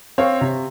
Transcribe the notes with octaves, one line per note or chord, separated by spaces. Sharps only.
C4 C#5 F5
C3